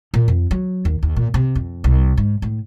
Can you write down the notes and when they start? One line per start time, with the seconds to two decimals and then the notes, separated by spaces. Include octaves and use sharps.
0.14 A#2
0.28 F2
0.51 F#3
0.85 D#2
1.03 D#2
1.16 A#2
1.34 C3
1.55 F2
1.84 C2
2.17 G#2
2.42 A2